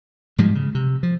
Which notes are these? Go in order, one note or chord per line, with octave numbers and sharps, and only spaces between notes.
G#2 F3 G3 G#3
C#3
C3
F3